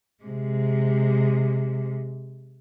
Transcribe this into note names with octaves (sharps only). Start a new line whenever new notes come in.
C3 G#3